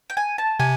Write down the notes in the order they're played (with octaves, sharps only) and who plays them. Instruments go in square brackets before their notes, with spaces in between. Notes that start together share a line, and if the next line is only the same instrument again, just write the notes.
[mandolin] G5
G#5
A5
[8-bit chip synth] C3 [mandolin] G#5